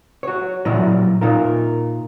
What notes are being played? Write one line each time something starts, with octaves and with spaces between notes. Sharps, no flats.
F#4 C#5
A#2 F#3 E4 D5 D#5
A#2 D#4 F4 A#4